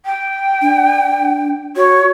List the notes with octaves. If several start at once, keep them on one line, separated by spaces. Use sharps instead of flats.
G5
D4
F#4 C#5